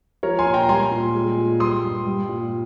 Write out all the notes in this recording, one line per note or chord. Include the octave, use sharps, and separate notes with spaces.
F3 A#4 C#5
G#5 C6
A#2
G5 A#5
G3 G#5 C6
A#2
G#3
A#2
G3 C6 D#6
G2
G3
A#2